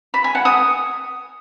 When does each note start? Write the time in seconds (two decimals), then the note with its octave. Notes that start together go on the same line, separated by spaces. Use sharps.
0.14 B5
0.24 G#5
0.35 F#5
0.45 D#6